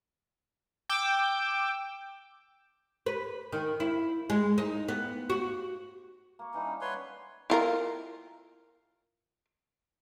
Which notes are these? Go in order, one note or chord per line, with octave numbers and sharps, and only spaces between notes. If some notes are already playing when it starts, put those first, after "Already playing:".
G5 D6 E6
B4
D#3
E4
G#3
D#4
B3
F#4
A#3 C#6
E3 G3 D4 D#4
C#4
G3 B4 C#5 E5 F#5 C6
E4 F4 A#4